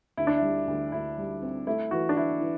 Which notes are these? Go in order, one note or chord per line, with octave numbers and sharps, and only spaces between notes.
D2 E4
D4
G3 E4
D2
D2 E4
G3
C4
A3 E4
E3 F#4
D4
E3 E4
E3